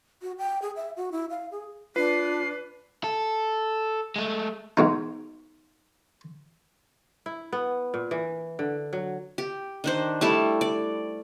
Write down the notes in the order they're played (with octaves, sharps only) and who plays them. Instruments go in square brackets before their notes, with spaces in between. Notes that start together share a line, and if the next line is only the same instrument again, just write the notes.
[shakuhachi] F#4
G5
G#4
E5
F#4
E4
F5
G#4
[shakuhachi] D4 [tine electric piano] F4 [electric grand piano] B4 [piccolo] C7
[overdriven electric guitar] A4
G#3 A3
[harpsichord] G#2 B2 D#4
[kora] E4
B3
A#2
E3
D3
F#3
[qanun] G4
D#3 D4 C5
G3 A3 E4 A5
D5